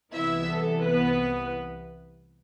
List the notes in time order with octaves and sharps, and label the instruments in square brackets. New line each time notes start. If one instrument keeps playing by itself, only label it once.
[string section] C2 C3 E3 B3 E4 E5
A4
B3 B4